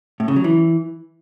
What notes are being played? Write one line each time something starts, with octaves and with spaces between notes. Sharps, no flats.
A2
C#3
F#3
E3